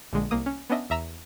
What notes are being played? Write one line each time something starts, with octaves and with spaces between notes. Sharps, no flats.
A#1 D3 G#3
C2 A#3 D#6
C#4
B3 C#4 D4 D#5 E5
E2 E5 A#5 E6